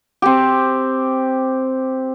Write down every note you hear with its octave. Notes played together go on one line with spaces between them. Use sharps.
C4 G4